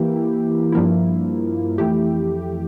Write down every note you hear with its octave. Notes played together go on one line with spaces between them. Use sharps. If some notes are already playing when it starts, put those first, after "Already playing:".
Already playing: E3 A#3 E4 G4
G2 F3 A#3 E4
F2 E3 A3 E4 G4